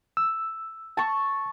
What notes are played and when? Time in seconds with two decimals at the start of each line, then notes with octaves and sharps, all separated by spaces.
0.17 E6
0.97 A5 C#6